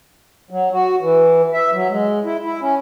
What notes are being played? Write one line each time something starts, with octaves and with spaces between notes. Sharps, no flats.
F#3
F#4
E3
E5
F#3
G#3
E4
E4
C#4